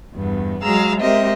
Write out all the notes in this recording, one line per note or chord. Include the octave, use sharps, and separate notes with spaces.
E2 G2 B3
F#3 G#3 G#4 F5 A#5 E6
G#3 C4 G4 A#4 D#5 E5